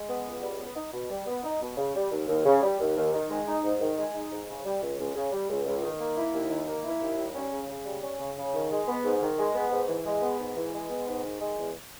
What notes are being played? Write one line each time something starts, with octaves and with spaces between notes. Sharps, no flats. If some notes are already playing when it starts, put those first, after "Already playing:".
Already playing: G#3
B3
C#2
G3
B3
D#4
B2
G3
B3
D#4
B2
C#3
G3
D#2
D#2
C#3
G3
D#2
D#2
D#3
G#3
D#4
G#2
D#3
G#3
D#4
G#2
C#3
G3
C#2
C#2
C#3
G3
C#2
C#2
D#3
A#3
E4
D#2
D#3
A#3
E4
D#2
G3
C#4
C#3
C#3
G3
C#4
C#3
C#3
D#3
G#3
B3
G#2
D#3
G#3
B3
G#2
E3
G#3
B3
G#2
E3
G#3
B3
G#2
D#3
G#3
E2